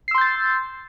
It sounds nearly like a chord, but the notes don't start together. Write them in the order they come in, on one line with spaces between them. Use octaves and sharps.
C7 E6 C6 G6 A6